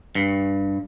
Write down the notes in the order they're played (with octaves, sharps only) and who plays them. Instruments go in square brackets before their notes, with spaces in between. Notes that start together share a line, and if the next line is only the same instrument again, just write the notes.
[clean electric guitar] G2